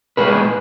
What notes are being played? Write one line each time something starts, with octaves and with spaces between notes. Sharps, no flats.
A#2 G#3 G#4 B4